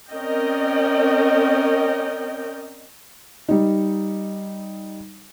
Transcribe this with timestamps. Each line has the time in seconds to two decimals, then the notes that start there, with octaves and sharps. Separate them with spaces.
0.11 C4 C#4 A#4 D5 D#5 G5
3.49 G3 D#4